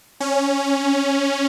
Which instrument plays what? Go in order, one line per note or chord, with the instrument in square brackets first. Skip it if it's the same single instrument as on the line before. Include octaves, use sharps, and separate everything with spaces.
[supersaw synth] C#4